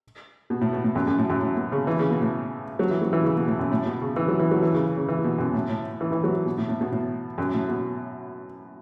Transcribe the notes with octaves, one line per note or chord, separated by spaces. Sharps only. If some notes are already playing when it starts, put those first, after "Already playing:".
B2
A2
B2
A2
F#2
F#2
A2
F#2
A2
B2
C#3
E3
C#3
B2
A2
F#3
E3
F#3
E3
C#3
B2
A2
F#2
A2
B2
C#3
E3
F#3
E3
F#3
E3
C#3
C#3
E3
B2
F#2
A2
A2
E3
E3
F#3
B2
A2
A2
B2
A2
F#2
A2
B2